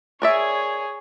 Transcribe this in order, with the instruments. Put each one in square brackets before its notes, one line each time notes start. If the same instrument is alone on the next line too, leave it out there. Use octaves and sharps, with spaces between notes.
[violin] G#4 C#5 [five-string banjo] A#4 D5 E5